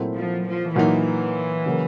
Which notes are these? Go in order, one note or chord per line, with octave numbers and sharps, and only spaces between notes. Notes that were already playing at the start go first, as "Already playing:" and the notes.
Already playing: A#2 F#3 A3 C4 E4
F3
F3
A#2 E3 F#3 A#3 D#4
C#3 F#3 A#3